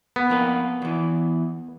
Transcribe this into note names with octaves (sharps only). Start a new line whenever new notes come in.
B3
F2 A#3 B4
E2 E3